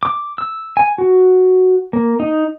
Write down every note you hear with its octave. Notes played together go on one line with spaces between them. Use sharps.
D6
E6
G#5
F#4
A#3
D#4